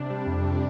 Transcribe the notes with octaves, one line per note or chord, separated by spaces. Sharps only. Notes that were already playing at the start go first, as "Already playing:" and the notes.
Already playing: C3 D4
G3
F2
C3